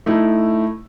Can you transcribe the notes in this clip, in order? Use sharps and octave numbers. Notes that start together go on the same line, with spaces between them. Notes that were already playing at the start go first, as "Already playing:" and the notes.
A3 D#4 E4